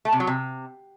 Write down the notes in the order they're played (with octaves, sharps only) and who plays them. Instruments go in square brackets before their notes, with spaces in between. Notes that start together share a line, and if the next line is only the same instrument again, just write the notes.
[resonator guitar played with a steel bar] A3
C3
F#3
C3